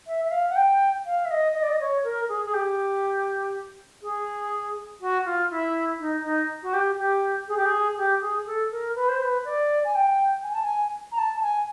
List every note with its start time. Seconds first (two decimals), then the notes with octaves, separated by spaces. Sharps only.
0.06 E5
0.24 E5
0.31 F5
0.49 F#5
0.55 G5
1.05 F5
1.25 E5
1.30 D#5
1.54 D#5
1.62 D5
1.68 D#5
1.80 C#5
2.03 A#4
2.28 G#4
2.45 G#4
2.53 G4
4.02 G#4
5.00 F#4
5.25 F4
5.50 E4
5.99 D#4
6.24 D#4
6.62 F#4
6.73 G4
6.97 G4
7.48 G#4
7.56 G4
7.65 G#4
7.97 G4
8.21 G#4
8.46 A4
8.71 A#4
8.95 B4
9.08 C5
9.22 B4
9.44 D5
9.84 G#5
9.95 G5
10.43 G#5
10.53 A5
10.62 G#5
11.11 A#5
11.17 A5
11.36 A5
11.42 G#5